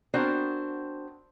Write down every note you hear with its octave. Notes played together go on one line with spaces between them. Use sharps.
B3 C4 D4 F#4 A#4 C5